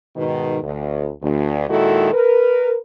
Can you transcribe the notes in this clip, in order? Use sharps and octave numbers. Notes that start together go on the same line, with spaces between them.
G#2 B2 D#3
D2
D2
A#2 D#3 G#3 E4 F#4 A4
A#4 B4